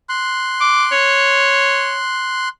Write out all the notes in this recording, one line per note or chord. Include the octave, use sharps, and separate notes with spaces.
C6 F#6
D6
C#5